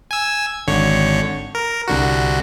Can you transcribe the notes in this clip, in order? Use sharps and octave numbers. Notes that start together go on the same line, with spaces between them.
G#5 E6
G#1 D3 C#5
A#4
C2 D3 F#4